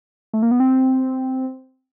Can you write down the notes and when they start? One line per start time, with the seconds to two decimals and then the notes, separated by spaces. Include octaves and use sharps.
0.33 A3
0.43 A#3
0.51 B3
0.60 C4